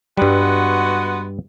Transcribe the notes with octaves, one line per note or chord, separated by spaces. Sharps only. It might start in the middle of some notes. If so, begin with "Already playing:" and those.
G2 G3 G#3 B3 F#4